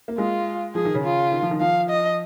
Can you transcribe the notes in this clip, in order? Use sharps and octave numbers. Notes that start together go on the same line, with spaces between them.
A#3
G#3 F4
F3 G#4
D#3
C#3
F4
D#3
F3
D#3
F3 F5
D#5